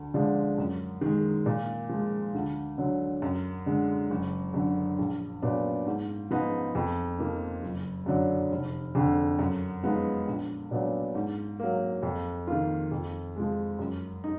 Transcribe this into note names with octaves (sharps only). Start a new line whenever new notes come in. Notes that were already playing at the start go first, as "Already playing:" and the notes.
Already playing: D2
D3 F3 G#3 D4
F#2
D#3 G#3
A#2
F3 G#3
D2
D3 F#3
F#2
D3 G#3
F#1
F#2 D3
A#1
A#2 F#3 B3 D4
G#2
F3 B3 D#4
F2
F3 A#3 D#4
F#1
F#2 D3 F#3 D4
F1
F2 D3
F#2
F3 G#3 B3 D#4
A#1
A#2 F#3 B3 D4
G#2
F#3 A#3
F2
D#3 A#3 F4
F2
F3 G#3
F#2
D#4